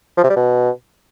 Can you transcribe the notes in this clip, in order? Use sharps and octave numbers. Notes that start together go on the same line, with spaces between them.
F3
C3
G3
B2